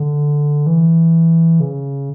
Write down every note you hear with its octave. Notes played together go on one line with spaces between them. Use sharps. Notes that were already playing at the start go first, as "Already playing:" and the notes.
Already playing: D3
E3
C#3